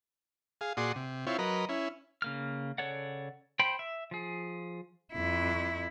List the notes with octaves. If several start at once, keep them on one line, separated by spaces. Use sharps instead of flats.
G#4 F5
A#2 F#4 G#4 D5 C6 D#6
C3
C4 E4 F4 C#5
F#3 A#4 B4 D#5
C#4 E4
C#3 A#3 F6
C#3 A4 C#5 D5 F#5
C5 G5 B5
E5
F3 G#4
F2 E4